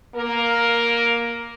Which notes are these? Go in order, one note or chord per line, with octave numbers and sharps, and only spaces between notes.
A#3 A#4